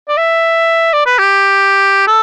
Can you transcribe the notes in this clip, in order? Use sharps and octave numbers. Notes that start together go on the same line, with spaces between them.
D5
E5
D5
B4
G4
A4